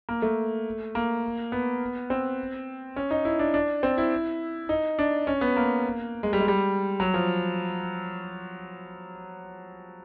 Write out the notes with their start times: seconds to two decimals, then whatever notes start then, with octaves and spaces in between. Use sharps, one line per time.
0.09 A#3
0.22 A3
0.95 A#3
1.52 B3
2.10 C4
2.96 C#4
3.11 D#4
3.25 E4
3.39 D4
3.54 D4
3.83 C4
3.98 E4
4.69 D#4
4.99 D4
5.27 C#4
5.41 B3
5.57 A#3
6.23 G#3
6.33 G3
6.40 G#3
6.48 G3
7.00 F#3
7.14 F3